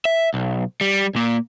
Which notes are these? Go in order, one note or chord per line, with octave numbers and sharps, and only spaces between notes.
E5
B1
G3
A#2 A#3